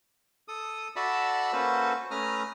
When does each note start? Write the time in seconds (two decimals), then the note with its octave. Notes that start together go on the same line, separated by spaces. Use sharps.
0.48 A4 D#6
0.96 F#4 A4 D5 E5 A5 B5
1.53 A#3 C#4 F#4 A4 B4 C5
2.11 A3 C#4 B4 A#5 D#6 F6